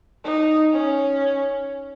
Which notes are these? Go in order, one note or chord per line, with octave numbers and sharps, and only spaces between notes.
D#4
C#4